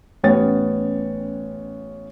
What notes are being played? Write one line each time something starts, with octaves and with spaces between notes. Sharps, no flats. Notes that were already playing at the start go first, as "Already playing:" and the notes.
A1 B3 C#4 C#5 G5 A6